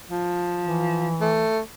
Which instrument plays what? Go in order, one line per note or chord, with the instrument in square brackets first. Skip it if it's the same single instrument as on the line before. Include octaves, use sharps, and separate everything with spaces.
[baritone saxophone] F3
[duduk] E3
[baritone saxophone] A3